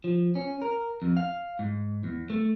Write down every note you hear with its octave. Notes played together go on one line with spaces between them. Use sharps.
F3
C#4
A#4
F2
F5
G#2
E2
A3